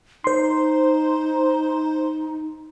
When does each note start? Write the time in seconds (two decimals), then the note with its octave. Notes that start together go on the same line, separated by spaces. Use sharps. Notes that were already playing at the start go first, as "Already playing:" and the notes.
0.24 D#4 C5 C6